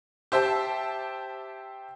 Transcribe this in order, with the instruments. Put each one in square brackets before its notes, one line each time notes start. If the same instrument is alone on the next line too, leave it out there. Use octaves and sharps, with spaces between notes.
[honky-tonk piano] G4 C5 E5 G5 A5